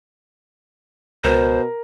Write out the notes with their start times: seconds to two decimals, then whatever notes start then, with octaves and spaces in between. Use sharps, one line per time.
1.24 C#2 B2 A#4 C5